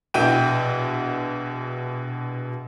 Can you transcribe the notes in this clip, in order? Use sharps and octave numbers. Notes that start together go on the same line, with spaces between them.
A#1 B2 E4 F#5 G5 D#7